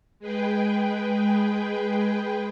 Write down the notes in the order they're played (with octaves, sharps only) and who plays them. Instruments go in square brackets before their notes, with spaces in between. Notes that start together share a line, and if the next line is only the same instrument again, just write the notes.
[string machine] G#3 G#4 B4 G5